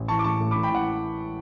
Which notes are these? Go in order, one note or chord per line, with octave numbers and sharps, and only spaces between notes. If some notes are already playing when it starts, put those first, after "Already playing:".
Already playing: A1
E3 A5 C#6
D6
A1 A5 C#6
A2
B5 D6
A1
G5 B5
E3 F#5